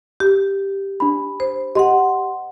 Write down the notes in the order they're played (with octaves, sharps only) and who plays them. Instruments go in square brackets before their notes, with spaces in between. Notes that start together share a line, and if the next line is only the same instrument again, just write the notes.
[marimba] G4
[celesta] D4 B5
[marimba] C5
[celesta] G4 C6 [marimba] D#5 F#5